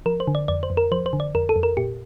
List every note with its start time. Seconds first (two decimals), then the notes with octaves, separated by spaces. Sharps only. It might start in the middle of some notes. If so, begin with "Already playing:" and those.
0.06 F3 A#4
0.20 C5
0.27 D3
0.35 D5
0.48 F2 D5
0.63 C5
0.70 F2
0.77 A#4
0.92 F3 C5
1.06 C5
1.13 D3
1.20 D5
1.35 F2 A#4
1.49 A4
1.56 F2
1.63 A#4
1.77 A#2 G4